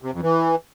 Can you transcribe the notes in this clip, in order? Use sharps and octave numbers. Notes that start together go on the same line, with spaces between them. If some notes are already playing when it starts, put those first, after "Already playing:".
C3
F2
E3